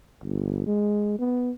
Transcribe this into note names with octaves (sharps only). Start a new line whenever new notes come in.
G1
G#3
B3